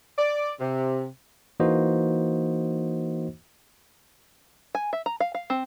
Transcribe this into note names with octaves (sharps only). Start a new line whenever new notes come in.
D5
C3
E3 A#3 D#4 F#4 C5 D#5
G#5
E5
A#5
F5
F5
C4